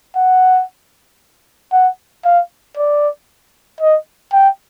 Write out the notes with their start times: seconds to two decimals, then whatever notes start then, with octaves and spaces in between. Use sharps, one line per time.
0.16 F#5
1.73 F#5
2.25 F5
2.77 D5
3.81 D#5
4.33 G5